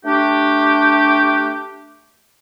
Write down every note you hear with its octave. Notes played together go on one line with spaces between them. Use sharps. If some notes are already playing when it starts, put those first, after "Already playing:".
A3 D4 G4